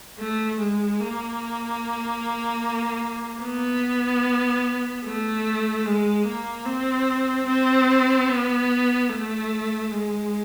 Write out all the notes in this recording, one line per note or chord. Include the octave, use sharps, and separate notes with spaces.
A3
G#3
A#3
B3
A3
G#3
A#3
C4
C4
B3
A3
G#3